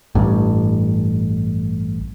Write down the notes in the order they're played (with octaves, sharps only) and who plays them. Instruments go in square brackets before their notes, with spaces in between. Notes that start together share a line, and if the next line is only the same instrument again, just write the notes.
[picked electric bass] A1 G2